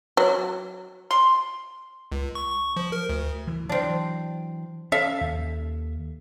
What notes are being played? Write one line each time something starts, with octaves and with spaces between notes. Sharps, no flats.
F#3
C6
C#2
C#6
C#6
F3
A#4
D2
E3
E3 F#3 C4 D4
C#4 A4 E5 F5
D#2